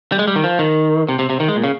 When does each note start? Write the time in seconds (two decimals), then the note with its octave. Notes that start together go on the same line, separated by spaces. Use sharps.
0.12 G3
0.19 G#3
0.28 G3
0.36 D#3
0.44 F3
0.59 D#3
1.09 C3
1.19 C3
1.30 C3
1.40 D#3
1.48 G#3
1.56 A#2
1.64 C#3